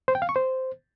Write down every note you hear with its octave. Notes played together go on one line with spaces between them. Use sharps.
C5
G5
F5
C#6
C5